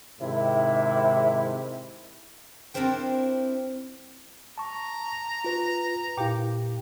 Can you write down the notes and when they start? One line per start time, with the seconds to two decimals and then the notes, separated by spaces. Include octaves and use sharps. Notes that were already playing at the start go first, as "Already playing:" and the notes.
0.20 G#2 C3 D#3 E4
2.74 C4 D4 E4 A#4 C5 G5
4.58 A5 A#5 C#6
5.44 F4 B4
6.17 A#2 E4 G4 F5 G5